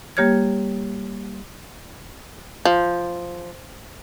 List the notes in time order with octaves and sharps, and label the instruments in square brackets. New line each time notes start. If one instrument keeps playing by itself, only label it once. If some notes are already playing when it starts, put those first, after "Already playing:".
[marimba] G3 A#3 G4 C#5 F6 G#6
[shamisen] F3